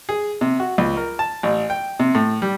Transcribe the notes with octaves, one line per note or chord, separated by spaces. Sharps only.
G#4
C3
F#4
C#2
A#4
A5
A1
G5
C3
A2
G3